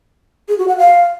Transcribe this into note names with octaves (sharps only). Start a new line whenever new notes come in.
G#4
F#4
F#5
F5